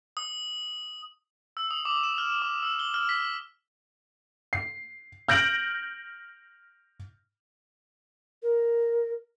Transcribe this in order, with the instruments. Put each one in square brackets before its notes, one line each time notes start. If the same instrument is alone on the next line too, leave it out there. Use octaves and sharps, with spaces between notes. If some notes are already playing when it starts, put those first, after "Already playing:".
[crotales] D#6
E6
D#6
D6
E7
F6
D6
E6
G7
F6
B6
[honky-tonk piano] C7
F6 G6 A#6 D7 F#7
[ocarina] A#4